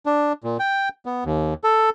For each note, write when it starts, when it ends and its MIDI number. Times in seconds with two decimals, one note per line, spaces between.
0.06 0.33 62
0.44 0.57 46
0.59 0.89 79
1.06 1.24 59
1.25 1.54 39
1.64 1.90 69